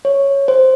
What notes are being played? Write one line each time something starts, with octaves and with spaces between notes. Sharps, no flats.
C#5
C5